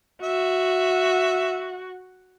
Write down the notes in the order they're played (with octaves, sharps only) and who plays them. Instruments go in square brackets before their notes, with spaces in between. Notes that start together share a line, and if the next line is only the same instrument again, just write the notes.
[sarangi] F#4 [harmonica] E5